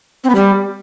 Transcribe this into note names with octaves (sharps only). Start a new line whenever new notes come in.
C4
B3
G3